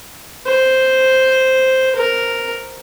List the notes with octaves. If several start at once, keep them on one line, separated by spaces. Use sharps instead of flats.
C5
A#4